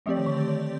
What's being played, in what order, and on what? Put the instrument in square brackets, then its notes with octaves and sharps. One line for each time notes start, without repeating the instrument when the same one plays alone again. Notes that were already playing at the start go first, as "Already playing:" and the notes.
[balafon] F3 [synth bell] A3 C4 G4 D5
[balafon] D#3
D3
D#3
D#3